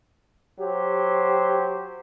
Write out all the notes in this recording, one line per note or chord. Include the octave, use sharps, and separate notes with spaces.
F#3 G4 C5